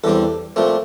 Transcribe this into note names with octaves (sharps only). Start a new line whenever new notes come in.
E2 D3 G3 C4 A4
A#2 F3 A3 C4